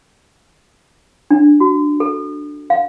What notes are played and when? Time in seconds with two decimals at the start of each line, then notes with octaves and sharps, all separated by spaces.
1.31 D4
1.60 F#4
2.00 A4
2.70 F5